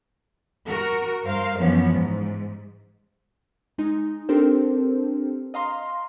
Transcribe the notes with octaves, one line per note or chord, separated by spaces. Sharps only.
F#4 A#4
G2 A#4 C5 F5
F#2 E3 F3 B3 C#4
G#2
G#3 D#4
C4 D4 G4 A4 A#4 C5
D#5 F5 A#5 C6